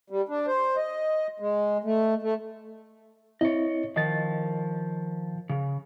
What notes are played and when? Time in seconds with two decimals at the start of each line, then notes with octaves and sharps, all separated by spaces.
0.10 G3
0.29 D4
0.47 C5
0.77 D#5
1.40 G#3
1.84 A3
2.22 A3
3.41 C4 E4 C#5 D#5
3.96 D#3 F3 D#5 A6
5.49 C#3